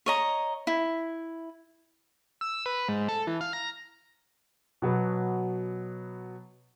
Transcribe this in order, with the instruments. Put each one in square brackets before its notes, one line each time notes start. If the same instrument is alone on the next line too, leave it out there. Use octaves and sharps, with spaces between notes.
[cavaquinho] C#5 D#5 A#5
E4
[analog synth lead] E6
B4
G#2
A4
E3
F5
A#5
[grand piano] B2 F#3 B3